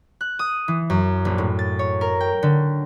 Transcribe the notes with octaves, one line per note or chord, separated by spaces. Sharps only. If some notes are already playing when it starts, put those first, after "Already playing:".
F#6
D#6
E3
F#2
A#1
A2
A6
C#5
A#4
G5
D3